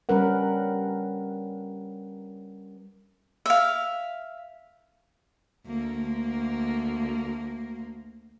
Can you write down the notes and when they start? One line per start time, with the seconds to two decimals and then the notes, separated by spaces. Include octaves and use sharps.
0.09 G3 C#4 A#4 B4 F#5
3.46 E5 F5
5.66 D2 A#3